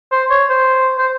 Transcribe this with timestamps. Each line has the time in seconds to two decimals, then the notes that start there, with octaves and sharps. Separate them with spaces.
0.12 C5
0.30 C#5
0.49 C5
0.98 C5